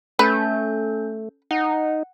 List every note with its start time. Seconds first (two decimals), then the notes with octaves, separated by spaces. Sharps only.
0.19 A3 C#4 A4 B4 G6
1.51 D#4 F#5